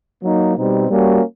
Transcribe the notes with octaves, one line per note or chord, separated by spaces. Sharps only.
F#3 A#3 D#4
B2 G3 C4 D#4
G3 A#3 C#4 F#4